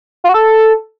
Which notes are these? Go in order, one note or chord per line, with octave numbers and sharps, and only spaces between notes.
F4
F#4
A4